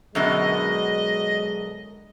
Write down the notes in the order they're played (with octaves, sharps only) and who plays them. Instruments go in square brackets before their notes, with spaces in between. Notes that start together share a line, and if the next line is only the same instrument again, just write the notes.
[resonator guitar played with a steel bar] F#2 B2 D3 [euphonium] G#3 [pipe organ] D#5